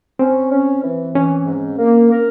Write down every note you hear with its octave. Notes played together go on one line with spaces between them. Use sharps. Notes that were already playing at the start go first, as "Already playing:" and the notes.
C4 C#4
C#4
E3
E3 C#4
G#2
A#3
A#4